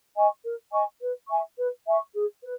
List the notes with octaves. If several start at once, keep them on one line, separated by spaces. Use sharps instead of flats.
D#5 G#5 C#6
A#4
D#5 G#5 C#6
B4
E5 G#5 C#6
B4
E5 G#5 C#6
G#4
B4